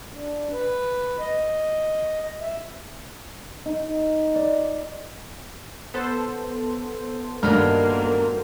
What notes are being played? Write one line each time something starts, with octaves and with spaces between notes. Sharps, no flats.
D4
B4
D#5
E5
D#4
D5
B3 A4 C5
G2 A#2 D#3 F#3 A#3 F6